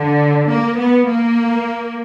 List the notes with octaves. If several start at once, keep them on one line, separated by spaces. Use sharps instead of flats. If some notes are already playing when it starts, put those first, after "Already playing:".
Already playing: D3
A#3
B3
A#3